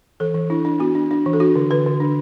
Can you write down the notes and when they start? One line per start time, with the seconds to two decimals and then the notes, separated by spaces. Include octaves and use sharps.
0.20 E3 A4
0.34 E3
0.50 D4 E4
0.65 D4
0.80 B3 F#4
0.95 D4
1.11 D4
1.26 E3
1.33 A4
1.40 D4 F#4
1.56 D3
1.70 D3 B4
1.86 D3
2.00 D4